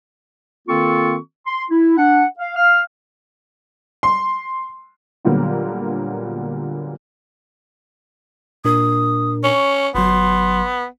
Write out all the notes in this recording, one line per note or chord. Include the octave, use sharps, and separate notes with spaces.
D#3 A#3 C4 F4 A4 C#6
C6
E4
D4 F#5
F5
F5 F6
C6
A#2 D3 F#3 G3 A#3 B3
A#2 D4 A#4 D#6
C#4 C#6
G1 F#3 B3 C6